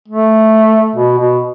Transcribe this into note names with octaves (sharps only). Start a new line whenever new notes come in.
A3
B2
B2